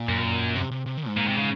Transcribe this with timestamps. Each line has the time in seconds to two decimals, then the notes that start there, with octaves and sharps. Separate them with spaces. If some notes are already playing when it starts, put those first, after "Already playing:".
Already playing: A#2
0.09 F#2
0.56 C3
0.71 C3
0.86 C3
0.97 D#3
1.07 G#2
1.17 A#2
1.28 C3
1.37 C#3